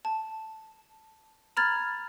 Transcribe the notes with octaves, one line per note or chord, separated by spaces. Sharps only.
A5
A#5 B5 F6 G#6 A6